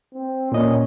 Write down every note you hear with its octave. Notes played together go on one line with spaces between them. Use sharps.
C4
A#2 C#4 D#5